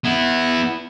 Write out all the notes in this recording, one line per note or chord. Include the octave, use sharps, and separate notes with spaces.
B3 E4